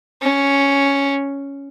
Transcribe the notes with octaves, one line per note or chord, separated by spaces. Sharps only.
C#4